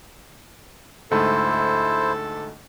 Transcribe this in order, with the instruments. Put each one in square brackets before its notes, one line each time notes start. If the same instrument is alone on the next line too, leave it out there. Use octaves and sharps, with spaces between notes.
[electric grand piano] D2 G#2 A3 [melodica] E4 C5 [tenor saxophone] A4